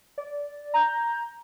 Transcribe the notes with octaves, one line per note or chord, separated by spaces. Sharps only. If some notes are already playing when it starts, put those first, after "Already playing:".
D5
A#5 G6